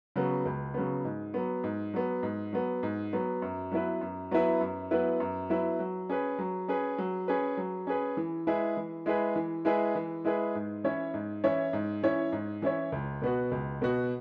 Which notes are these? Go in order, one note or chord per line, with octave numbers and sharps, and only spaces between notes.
C#3 F#3 B3
C#2
C#3 F#3 B3
G#2
F#3 B3
G#2
F#3 B3
G#2
F#3 B3
G#2
F#3 B3
F#2
F#3 B3 E4 B4
F#2
F#3 B3 E4 B4
F#2
F#3 B3 E4 B4
F#2
F#3 B3 E4 B4
F#3
C#4 G#4 B4
F#3
C#4 G#4 B4
F#3
C#4 G#4 B4
F#3
C#4 G#4 B4
E3
G#3 E4 G#4 B4
E3
G#3 E4 G#4 B4
E3
G#3 E4 G#4 B4
E3
G#3 E4 G#4 B4
G#2
E3 C#4 E4 C#5
G#2
E3 C#4 E4 C#5
G#2
E3 C#4 E4 C#5
G#2
E3 C#4 E4 C#5
C#2
B2 B3 F#4
C#2
B2 B3 F#4